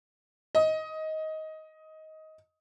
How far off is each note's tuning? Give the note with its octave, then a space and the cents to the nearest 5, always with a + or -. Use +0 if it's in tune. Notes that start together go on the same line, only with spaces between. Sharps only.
D#5 +15